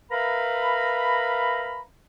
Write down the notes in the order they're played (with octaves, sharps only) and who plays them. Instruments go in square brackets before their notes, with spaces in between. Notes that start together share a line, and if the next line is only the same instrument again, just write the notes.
[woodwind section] A#4 B4 E5 F5 A#5 B5